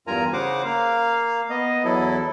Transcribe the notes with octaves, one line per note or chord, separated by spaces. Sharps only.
E2 G2 F4 A#4 G#5 A#5
C#3 C5 F#5 D6
A#3 F5
B3 D#5
E2 F#3 E4 A4